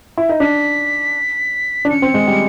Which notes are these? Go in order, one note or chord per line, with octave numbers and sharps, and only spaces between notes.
E4
D#4
D4 B6
D4
C#4 C#7
C4
G#3
G3